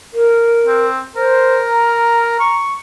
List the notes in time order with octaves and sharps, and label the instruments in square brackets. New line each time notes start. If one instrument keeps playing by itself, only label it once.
[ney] A#4
[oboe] C4
[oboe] A#4 [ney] C5
[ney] A#5
[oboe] C#6